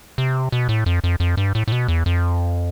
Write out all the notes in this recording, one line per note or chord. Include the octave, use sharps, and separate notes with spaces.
C3
B2
A2
F2
F2
F2
G2
A2
A2
B2
E2
F2